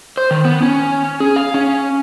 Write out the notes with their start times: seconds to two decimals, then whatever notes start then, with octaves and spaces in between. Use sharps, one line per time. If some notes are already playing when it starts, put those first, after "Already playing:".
0.17 C5
0.31 D#3
0.45 B3
0.62 C#4
1.20 G#4
1.36 F5
1.54 C#4